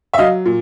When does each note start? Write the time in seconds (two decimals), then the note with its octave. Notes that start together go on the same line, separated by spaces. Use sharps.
0.14 E5
0.18 F#3 D#5 F5
0.46 A#2